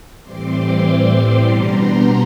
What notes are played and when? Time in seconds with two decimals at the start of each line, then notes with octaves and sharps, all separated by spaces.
0.22 A2 E3 G3 C4 C6 D6
1.43 B2 G3 B3 D4 A#5 C6